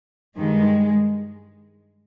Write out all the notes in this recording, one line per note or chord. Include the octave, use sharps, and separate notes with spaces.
G2 D#3 G#3